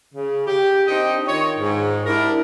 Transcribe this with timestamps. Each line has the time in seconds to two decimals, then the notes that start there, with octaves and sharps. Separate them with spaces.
0.15 C#3
0.47 G4
0.88 C4 D4 D#4 D#5 G5
1.27 D#3 F4 C#5
1.59 G#2
2.06 D4 E4 G4 A#4